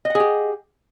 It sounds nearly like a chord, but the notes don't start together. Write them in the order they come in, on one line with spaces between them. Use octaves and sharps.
D#5 F#5 G#4 G4